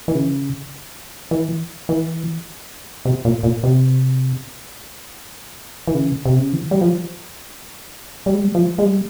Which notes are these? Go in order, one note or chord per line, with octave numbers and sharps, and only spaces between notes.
E3
C#3
E3
E3
C3
A#2
A#2
C3
E3
C#3
C3
C#3
E3
G3
F3
G3
G#3
G3
F3
G#3
G3